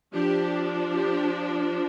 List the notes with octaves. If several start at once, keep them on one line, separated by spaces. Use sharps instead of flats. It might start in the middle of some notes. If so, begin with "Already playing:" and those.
F3 D4 G4
G4